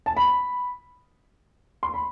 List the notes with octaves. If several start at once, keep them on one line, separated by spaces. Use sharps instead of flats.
A5
B5
C6
B5